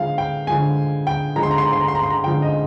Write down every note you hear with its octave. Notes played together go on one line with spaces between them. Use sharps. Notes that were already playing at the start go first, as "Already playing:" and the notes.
Already playing: D3 F3 G#3 F5
G5
D3 F3 G#3 G#5
G5
D3 F3 G#3 A#5
C6
A#5
C6
A#5
C6
A#5
C6
A#5
C6
A#5
D3 F3 G#3 G5
D#5